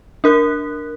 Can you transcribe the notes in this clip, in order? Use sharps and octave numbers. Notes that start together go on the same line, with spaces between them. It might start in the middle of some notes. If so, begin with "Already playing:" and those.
D4 A#4 F#6